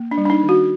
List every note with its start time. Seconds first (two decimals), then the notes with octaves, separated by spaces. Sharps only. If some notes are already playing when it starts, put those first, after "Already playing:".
Already playing: A#3
0.11 D4
0.18 G3
0.25 D4
0.30 D#4
0.43 D#3
0.49 F#4